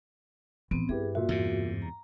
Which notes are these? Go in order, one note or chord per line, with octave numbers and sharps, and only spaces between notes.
A2 E3 B3 C4
G2 E4 G4 G#4 B4
A#2 F#4 E5
E2 G#2 C3
A#5